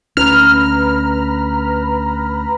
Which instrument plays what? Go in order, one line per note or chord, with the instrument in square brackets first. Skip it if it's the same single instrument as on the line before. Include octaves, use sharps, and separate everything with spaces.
[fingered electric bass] D2 C#4 [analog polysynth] B4 A#5 B5 [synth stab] F6